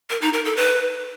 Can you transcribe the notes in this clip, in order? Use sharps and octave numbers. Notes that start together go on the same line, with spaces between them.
A#4
D#4
A#4
A4
B4